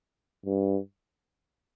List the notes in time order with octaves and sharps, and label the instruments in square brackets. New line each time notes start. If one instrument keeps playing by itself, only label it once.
[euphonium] G2